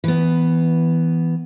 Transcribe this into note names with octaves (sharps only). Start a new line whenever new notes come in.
E3 B3